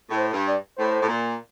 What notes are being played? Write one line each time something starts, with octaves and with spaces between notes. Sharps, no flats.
A2
C5
G2
D5
A2 C5
A2
A#2